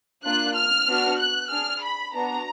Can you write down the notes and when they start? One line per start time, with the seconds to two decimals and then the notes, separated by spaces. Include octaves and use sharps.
0.25 A#3 D4 F4 F#6
0.56 F6
0.88 B3 D4 F#4
1.19 F#6
1.51 D4 G#4 F6
1.82 B5
2.14 B3 D4 F#4 A#5